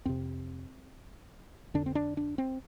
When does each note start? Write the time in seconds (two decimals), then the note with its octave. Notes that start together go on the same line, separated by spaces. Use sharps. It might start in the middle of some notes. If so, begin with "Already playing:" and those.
0.05 F2 C3 C4
1.74 F2 D3 D4
1.86 C4
1.95 D4
2.17 D4
2.38 C4